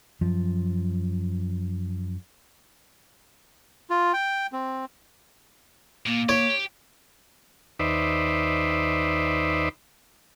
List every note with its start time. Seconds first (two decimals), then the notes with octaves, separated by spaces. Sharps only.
0.21 F#2 F3
3.90 F4
4.13 G5
4.53 C4
6.06 A#2 A#3
6.29 G4 C#5
7.79 D#2 D#4 B4 C5 D5 E5